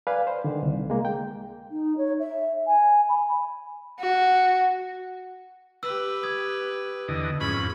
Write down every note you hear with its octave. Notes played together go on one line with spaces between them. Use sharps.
B4 D5 F5 G#5
C5
D3 D#3
C2
G#3 A#3
G5
D#4
C#5
E5
G#5
B5
F#4
G4 B4 E6
D#6 G#6
E2 D3 D#5
F2 G#2 C#4 B5